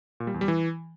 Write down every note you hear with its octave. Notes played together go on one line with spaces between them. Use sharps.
A#2
G3
E2
G3
E3